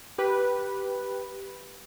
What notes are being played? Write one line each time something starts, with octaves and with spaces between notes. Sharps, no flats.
G4 B4